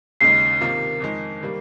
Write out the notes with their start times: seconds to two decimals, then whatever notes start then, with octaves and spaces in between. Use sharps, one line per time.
0.21 D#2 C#3 G#3 D#4 C7
0.61 C3 D#3 A#3 F4
1.00 F2 D#3 G#3 D#4
1.41 D#3 G3 A#3